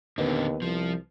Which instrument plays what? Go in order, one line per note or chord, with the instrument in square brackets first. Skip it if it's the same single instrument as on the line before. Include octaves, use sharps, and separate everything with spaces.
[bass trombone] D#2 [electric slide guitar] D3 C4 [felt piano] B3 B4 D#5
[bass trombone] C2 [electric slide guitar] F3